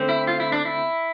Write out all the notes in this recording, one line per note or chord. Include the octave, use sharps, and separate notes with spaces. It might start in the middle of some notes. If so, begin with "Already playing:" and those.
Already playing: D3 A3 C4
E4
F4
E4
D4
E4